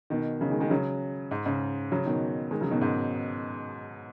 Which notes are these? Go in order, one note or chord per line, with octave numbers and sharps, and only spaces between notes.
B2 D#3
C#3 F#3
D#3 G#3
D#3 G#3
C#3 F#3
G#2
G#2 C#3
C#3 F#3
B2 D#3
D#3 G#3
C#3 F#3
B2 D#3
G#2 C#3